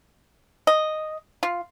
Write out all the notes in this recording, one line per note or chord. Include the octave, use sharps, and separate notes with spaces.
D#5
F4